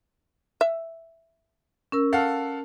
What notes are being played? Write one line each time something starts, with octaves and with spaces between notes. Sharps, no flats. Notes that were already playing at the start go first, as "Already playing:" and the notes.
E5
C#4 A#4 E6
A4 F5 F#5